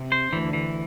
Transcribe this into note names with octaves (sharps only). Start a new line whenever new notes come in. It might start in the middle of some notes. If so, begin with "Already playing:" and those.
Already playing: C3
C5
D2 D3 E3
E3